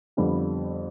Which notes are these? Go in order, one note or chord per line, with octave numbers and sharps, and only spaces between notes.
F2 D3 G3 B3 F4